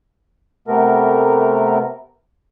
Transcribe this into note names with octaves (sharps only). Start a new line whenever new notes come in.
C3 A3 B3 A#4